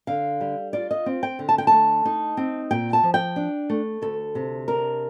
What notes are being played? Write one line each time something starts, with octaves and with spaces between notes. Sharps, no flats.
D3 F5
G3
F4 D5
D#5
C4
G5
D3
A5
G5
A3 A5
D#4
C4
A#2 G5
A5
F3
G5
D4
A3
D2 A4
C3
D4 A#4